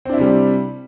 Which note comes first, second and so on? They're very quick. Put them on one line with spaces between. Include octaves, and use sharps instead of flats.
C4 D4 E4 C3 G3